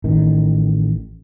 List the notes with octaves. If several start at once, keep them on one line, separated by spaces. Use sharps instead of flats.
A1 D#3